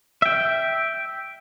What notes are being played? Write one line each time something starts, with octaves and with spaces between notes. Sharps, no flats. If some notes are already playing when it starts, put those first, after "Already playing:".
E5 G5